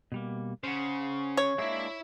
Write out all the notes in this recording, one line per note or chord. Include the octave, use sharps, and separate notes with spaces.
B2 G3 A#3
C#3 C5 F#5
C#5
G#3 A#3 D4 E4 E5